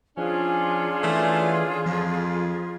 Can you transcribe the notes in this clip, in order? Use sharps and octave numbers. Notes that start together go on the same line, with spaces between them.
F3 C#4 D4 F4 G#4
E3 A3
F2 F3